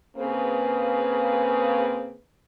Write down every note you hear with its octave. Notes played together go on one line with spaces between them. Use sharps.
C#3 A#3 C4 G#4 B4